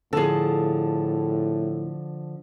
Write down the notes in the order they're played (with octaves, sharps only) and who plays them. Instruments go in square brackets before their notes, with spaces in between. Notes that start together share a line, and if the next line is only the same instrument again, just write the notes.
[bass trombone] A2 [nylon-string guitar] D3 F3 [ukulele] G#4 A4